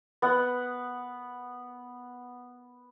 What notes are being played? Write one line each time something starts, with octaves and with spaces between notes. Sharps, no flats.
B3 F#5